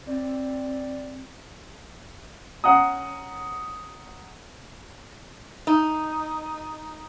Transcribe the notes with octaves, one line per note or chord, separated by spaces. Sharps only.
C4 D5
C#4 F#5 A#5 D#6
D#4